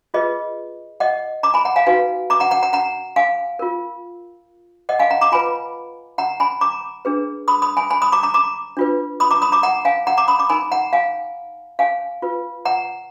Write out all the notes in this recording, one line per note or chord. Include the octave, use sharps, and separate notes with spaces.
F4 G#4 B4 D#5
D#5 F#5
A#5 D6
G#5 B5
F#5 A#5
F5 G#5
D#4 F#4 B4 F5 G#5
A#5 D6
F#5 A#5
F#5 A#5
F#5 A#5
F#5 A#5
F5 G#5
F4 A#4
D#5 F#5
F5 G#5
F#5 A#5
A#5 D6
F4 B4 G#5 B5
F#5 A#5
G#5 B5
A#5 D6
D4 G#4 B4
B5 D#6
B5 D#6
G#5 B5
G#5 B5
B5 D#6
A#5 D6
A#5 D6
A#5 D6
D4 F4 B4
B5 D#6
A#5 D6
B5 D#6
A#5 D6
F#5 A#5
F5 G#5
F#5 A#5
A#5 D6
B5 D#6
A#5 D6
D#4 A#4 G#5 B5
F#5 A#5
F5 G#5
F5 G#5
F4 B4
F#5 A#5